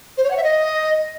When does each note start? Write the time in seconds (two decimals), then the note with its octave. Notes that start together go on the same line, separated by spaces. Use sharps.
0.18 C5
0.24 C#5
0.30 F#5
0.37 E5
0.43 D#5